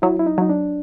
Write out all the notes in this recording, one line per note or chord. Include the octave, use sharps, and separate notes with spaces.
F#3 E4
E4
D#4
F#3 D#4
D4